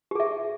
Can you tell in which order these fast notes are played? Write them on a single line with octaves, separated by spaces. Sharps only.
G4 G#4 E5